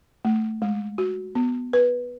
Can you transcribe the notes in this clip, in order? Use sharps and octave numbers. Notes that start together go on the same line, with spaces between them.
A3
G#3
F#4
B3
B4